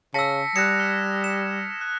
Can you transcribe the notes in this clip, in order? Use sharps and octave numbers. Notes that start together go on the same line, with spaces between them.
C#3 A5 E6 A#6 B6 C#7
G3 D#6 F#6 G#6 A#6 C#7 E7
F6
E7
F#6